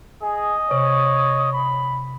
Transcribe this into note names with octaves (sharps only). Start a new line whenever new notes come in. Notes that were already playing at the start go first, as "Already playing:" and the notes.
G#4 D#5
C3 C#5
B5